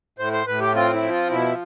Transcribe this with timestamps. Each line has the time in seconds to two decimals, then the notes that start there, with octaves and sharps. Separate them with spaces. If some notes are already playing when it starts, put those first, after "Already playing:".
0.19 A2 C5
0.33 C5
0.47 A2 B4
0.60 G4
0.74 C4 F4
0.93 E4
1.02 F3
1.11 F4
1.30 B2 E4